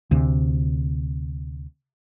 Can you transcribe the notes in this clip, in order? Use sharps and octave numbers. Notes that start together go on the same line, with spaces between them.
D2 C3